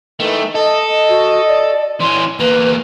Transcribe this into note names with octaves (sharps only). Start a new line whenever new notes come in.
D#3 E3 A3
A4 D#5
F#4
D5
E3 C#4 C6
E2 A#3 B4